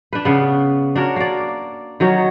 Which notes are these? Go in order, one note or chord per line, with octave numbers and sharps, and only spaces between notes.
D4 B4
C#3 B3
D4 F#4 A#4 C#5
A#3 D5
D#3 F#3 D#4 C#5